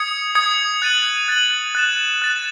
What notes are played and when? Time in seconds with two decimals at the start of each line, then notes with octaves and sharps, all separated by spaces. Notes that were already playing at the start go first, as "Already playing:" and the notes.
Already playing: D#6 G#6 C#7
0.35 D#6 G#6 C#7
0.82 F#6 A6 D#7 F#7
1.28 F#6 A6 D#7 F#7
1.75 F#6 A6 E7
2.22 F#6 A6 E7